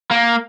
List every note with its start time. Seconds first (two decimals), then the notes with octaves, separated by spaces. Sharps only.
0.11 A#3